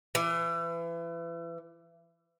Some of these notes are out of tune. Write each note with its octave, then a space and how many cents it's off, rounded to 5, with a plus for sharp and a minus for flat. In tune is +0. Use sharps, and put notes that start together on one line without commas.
E3 +30